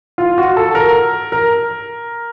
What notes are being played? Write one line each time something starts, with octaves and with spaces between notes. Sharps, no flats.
F4
F#4
A4
A#4
A#4